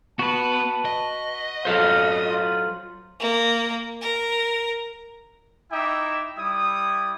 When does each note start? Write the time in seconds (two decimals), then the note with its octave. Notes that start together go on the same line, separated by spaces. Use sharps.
0.19 B3 F#4 B4 A5
0.85 D#5
1.65 F#3 A4 C5 F5
2.27 F4
3.20 A#3
4.01 A#4
5.71 D#4 E4 E5 G5 D6
6.37 G3 E4 D#6